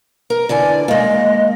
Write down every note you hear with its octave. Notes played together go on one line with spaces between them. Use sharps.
A#4
D3 E3 D5 G#5
G#3 A#3 D#5